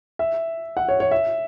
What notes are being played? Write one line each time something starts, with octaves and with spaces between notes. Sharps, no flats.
E5
F#5
C#5
C#5
E5